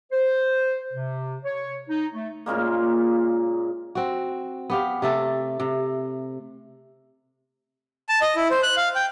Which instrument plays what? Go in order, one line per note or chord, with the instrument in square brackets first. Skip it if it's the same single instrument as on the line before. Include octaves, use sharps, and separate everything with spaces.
[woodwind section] C5
C3
C#5
D#4
A3
[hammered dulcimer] A#2 C#3 G#3 A#3
[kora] C4 F#4
B3 G4 F5
C3 A3 A4
C3
[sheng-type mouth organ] A5
D#5
E4
C5
F#6
F5
G5